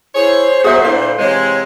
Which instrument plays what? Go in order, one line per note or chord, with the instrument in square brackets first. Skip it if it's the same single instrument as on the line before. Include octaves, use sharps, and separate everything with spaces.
[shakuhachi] E4 [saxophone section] G#4 C#5 [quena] C5
[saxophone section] A#2 F#3 F#4 [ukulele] G#4 E5 [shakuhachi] A4
[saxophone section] A#2 D3 [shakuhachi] E4 [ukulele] F5
[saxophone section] C3 E3 G#3 [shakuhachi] C#5